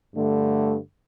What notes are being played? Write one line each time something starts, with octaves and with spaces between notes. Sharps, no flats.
G2 D3 A3